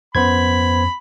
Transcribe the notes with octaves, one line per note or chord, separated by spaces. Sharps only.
F2 B3 C#4 C5 B5 G#6